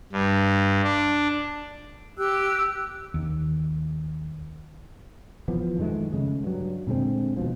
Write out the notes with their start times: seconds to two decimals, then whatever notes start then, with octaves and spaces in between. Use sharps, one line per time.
0.12 G2
0.84 D4
2.18 G4 G5 E6 F#6
3.14 D#2
5.48 E3 F3 B3
5.78 F#2 D#3 G#3 A3
6.12 C#3 G#3
6.43 G2 F#3
6.87 A#2 D3 G#3 C4
7.37 D#2 B2 F3